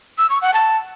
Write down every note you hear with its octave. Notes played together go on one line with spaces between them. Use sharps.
E6
C#6
F#5
A5